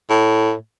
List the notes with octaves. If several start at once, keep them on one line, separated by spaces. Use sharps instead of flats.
A2